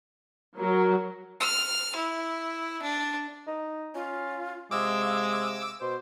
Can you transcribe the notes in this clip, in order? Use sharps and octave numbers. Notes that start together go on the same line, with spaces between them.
F#3 A#4
F6
E4
D4
D#4
C#4 F4
C3 G#3 F5 D6 E6
B2 C5